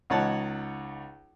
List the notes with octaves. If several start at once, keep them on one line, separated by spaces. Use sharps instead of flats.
C#2 D#4 C#5 F#5 A5